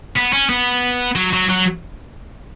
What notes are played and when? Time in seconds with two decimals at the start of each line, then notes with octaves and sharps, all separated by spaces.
0.16 B3
0.33 C#4
0.49 B3
1.16 F#3
1.33 F#3
1.49 F#3